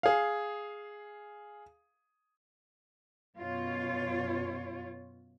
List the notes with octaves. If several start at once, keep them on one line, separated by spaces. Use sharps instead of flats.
G#4 F5
F#2 B2 F4 C#5